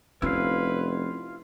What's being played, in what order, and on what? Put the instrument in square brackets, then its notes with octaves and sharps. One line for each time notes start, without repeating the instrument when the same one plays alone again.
[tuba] F1 [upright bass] C#4 [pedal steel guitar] E4 F4 F5 [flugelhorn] B4